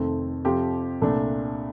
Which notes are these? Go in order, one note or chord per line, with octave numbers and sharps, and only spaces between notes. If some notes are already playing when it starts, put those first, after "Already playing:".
Already playing: F1 F2 D#3 A3 C4
F2 C3 F3 C4 G4
C2 A#2 A3 D4